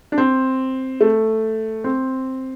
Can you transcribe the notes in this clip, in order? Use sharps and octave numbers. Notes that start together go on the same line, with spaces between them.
D4
C4
A3
C4